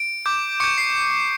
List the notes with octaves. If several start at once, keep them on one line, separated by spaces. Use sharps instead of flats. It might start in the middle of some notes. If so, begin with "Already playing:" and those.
Already playing: D7
D6 G6
C#6 D6 G6 C#7
C7